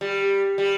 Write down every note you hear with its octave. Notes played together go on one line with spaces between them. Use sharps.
G3
G3